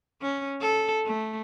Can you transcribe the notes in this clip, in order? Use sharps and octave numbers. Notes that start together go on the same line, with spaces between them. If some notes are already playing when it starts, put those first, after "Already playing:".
C#4
A4
A3